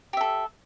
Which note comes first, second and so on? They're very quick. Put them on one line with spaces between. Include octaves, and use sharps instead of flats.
G4 E5 A4